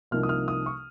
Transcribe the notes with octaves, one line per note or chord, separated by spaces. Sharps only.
C2 C3 F3 A#3 D#4 F6
D#6
F6
D#6
C#6